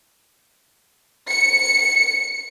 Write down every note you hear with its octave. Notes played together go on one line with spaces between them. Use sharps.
C#7